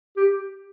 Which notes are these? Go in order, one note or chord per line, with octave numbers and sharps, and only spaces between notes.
G4